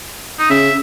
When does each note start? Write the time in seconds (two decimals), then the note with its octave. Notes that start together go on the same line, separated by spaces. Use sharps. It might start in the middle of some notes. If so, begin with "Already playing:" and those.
0.39 D#4
0.50 C#3 E5